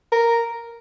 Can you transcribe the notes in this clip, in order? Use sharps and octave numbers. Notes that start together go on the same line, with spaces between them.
A#4